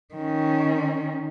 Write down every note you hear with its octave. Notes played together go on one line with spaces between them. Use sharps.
D#3 C#4